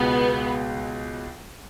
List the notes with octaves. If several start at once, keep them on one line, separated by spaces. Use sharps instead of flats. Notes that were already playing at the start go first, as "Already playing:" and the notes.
Already playing: C#2 B2 G#3 B3